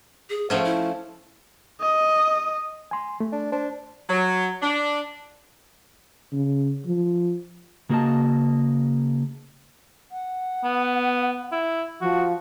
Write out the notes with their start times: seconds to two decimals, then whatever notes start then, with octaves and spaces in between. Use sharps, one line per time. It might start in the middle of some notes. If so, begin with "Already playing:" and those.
0.30 G#4
0.50 F3 A3 C#4 F#5
0.64 E4
1.81 D#5
2.91 G#5 C6
3.20 A3
3.32 D4
3.52 D4 C5
4.10 F#3
4.62 D4
6.32 C#3
6.86 F3
7.89 C#3 A#3 F#4 A4 D#5 A5
10.12 F#5
10.64 B3
11.52 E4
12.01 F3 F#4